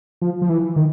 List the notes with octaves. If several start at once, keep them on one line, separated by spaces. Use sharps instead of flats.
F3
F3
E3
D#3